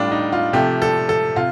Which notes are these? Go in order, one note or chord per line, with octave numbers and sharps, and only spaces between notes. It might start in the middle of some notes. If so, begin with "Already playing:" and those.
Already playing: A2 G3 D4 F4
D#4
F4
C3 F3 A3 G4
A4
A4
C3 F4